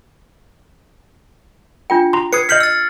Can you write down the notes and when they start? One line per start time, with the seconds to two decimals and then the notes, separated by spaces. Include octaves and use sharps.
1.90 D4 F4 G5
2.13 A#5 C6
2.33 B4 D#6 G#6 C7 C#7
2.49 D#5 F6 G6 B6 C#7 F#7
2.60 E6 A6